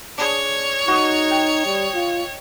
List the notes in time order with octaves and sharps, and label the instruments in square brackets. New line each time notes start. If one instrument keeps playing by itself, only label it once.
[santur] D4 G#4 [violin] C#5
[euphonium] D#4 [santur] F#4 D#5
[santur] G5
[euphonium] G3
F4